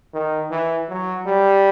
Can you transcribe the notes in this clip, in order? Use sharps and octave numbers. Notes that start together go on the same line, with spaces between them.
D#3
E3
F#3
G3